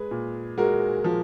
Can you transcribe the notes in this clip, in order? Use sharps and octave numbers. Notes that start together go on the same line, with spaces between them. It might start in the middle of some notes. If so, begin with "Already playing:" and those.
Already playing: G#3 G#4 B4
A#2
G#3 F#4 A#4
F3